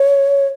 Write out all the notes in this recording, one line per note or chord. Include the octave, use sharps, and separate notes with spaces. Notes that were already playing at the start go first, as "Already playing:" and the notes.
Already playing: C#5